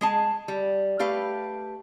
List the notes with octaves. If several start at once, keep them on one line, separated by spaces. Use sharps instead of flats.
G#3 G#4 A5
G3
A3 G4 B4 F5